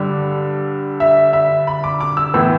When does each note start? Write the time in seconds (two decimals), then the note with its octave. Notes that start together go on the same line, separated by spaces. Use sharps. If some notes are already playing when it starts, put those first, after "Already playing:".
Already playing: G2 D3 G3 D6
1.00 E5
1.33 E5
1.67 B5
1.84 D6
2.01 D6
2.17 E6
2.34 A2 E3 B3 E6